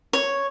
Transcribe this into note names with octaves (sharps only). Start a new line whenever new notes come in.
C#5